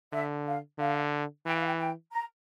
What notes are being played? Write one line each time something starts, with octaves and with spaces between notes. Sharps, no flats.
D3 E5
F5
D3 F5
E3 G5
F5
G5
G5
A#5